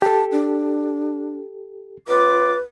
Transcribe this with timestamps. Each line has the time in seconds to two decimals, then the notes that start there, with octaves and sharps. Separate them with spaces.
0.02 G4 A4 A5
0.32 D4
2.08 C#2 F4 B4 D6